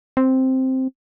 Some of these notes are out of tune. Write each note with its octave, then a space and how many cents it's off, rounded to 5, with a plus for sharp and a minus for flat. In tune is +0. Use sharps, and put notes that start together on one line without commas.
C4 +0